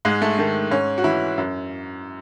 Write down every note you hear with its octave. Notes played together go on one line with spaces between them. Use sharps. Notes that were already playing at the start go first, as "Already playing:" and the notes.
G#2 G#3
A3
D#3 A3
G#2 C#4
F#4
E3 E4
F#2